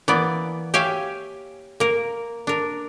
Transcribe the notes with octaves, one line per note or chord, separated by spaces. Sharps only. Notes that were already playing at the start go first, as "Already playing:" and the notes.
E3 A#3 B3 D5
G4 C#5 E5 F5 G5 G#5
A#3 A#4
D4 A#4